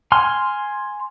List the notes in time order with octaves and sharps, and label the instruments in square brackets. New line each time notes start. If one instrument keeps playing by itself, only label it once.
[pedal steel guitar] G#5 C6 F6